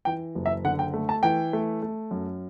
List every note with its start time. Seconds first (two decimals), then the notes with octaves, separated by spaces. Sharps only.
0.05 E3 G5
0.35 F#1
0.46 E5
0.64 D3 F#5
0.79 G5
0.94 A3
1.09 A5
1.23 E3 G5
1.53 A3
1.82 A3
2.11 F#2